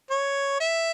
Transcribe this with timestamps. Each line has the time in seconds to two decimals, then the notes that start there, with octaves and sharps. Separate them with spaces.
0.10 C#5
0.60 E5